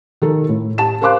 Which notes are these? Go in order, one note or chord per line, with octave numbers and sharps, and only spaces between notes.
D#3 A4 A#4
A2
G4 A5 E7
A#4 C5 F5 C6 D6 F#6